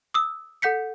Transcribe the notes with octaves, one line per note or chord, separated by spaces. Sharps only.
D#6 E6
A4 F#5 G6 B6 C#7